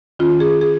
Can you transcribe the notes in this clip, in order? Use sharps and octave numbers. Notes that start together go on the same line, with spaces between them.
D#3 C#4 F4
F4
G#4
G#4
G#4